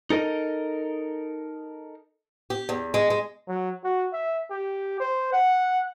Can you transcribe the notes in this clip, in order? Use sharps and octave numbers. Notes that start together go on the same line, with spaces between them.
D#4 A4 A#4 D#5
G4
E2
G#3
G#3
F#3
F#4
E5
G4
C5
F#5